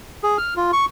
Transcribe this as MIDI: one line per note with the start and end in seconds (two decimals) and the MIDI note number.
0.23 0.38 68
0.38 0.54 89
0.57 0.71 65
0.73 0.85 85